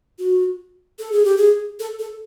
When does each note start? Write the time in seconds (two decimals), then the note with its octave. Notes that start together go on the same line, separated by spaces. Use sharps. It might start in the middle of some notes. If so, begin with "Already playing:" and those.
0.19 F#4
0.99 A4
1.12 G#4
1.24 G4
1.37 G#4
1.80 A4
1.99 A4